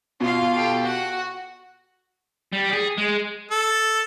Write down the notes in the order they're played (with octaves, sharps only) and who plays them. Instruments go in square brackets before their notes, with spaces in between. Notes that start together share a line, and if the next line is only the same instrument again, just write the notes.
[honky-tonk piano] B2 [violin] F4 F5
[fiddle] G4 A4
[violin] F#4 [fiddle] F#5
[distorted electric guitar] G3
G4 G#4
G#3
[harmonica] A4